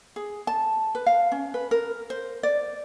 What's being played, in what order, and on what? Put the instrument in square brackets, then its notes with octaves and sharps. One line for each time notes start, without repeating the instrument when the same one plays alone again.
[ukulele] G#4
A5
B4
F5
C#4
B4
A#4
C5
D5